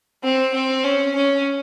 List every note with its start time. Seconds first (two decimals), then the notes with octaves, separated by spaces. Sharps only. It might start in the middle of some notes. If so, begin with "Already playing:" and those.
0.23 C4
0.53 C4
0.84 C#4
1.15 C#4